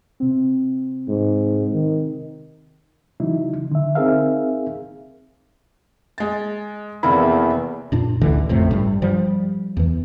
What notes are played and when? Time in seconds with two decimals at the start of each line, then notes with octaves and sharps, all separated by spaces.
0.20 C3 C4
1.08 G#2
1.73 D#3
3.20 C#3 E3 F#3 D#4 E4
3.72 D3 E5
3.95 C4 D#4 G#4 A#4 E5 F5
6.18 G#3 A6
7.03 F1 E2 A#3 E4 B5
7.92 F#2 A#2 D4
8.21 A1 D2 D3 E3
8.49 A1 F2 A2 C3
8.71 G2 G3
9.02 F3 G3
9.77 E2 E3